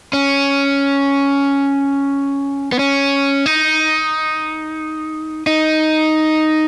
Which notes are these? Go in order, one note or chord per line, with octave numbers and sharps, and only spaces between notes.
C#4
B3
C#4
D#4
D#4